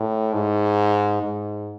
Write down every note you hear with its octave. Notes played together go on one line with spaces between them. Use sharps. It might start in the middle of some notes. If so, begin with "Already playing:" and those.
Already playing: A2
G#2
G#2